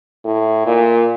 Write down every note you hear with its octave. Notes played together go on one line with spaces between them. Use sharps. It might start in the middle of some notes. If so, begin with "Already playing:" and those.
A2
A#2